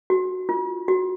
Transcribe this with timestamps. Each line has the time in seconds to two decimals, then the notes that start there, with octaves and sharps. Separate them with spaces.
0.10 F#4
0.49 F4
0.88 F#4